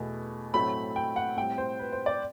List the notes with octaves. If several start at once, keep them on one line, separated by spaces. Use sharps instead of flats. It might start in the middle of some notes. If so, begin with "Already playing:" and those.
Already playing: E2 B2 A3
A2 F#3 A3 C4 B5
G5
F#5
A2 G3 C4 G5
C5
B4
C5
D5